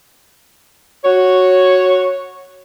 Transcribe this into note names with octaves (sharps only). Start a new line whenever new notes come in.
F#4 C#5